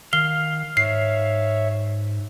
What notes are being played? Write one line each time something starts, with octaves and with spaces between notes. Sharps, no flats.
D#3 F5 G7
G#2 C#5 E5 C7